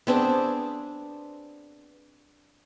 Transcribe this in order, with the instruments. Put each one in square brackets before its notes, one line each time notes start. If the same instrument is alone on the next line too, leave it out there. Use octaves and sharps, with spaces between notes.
[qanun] B3 C4 D4 G#4